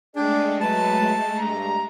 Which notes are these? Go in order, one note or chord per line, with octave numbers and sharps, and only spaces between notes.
G#3 A3 D4 G#4 D5 G5
F#3 B4 A5
G2 A#5